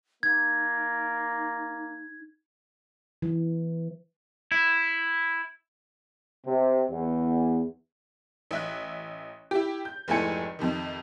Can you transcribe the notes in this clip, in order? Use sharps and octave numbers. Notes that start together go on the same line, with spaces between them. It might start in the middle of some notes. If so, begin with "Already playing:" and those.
A#3 D#4 G#6
E3
E4
C3
E2
A1 E5 F#6
E4 G4
G6
F1 G#2 A3 E4 G#5 C#7
F2 C3 D#3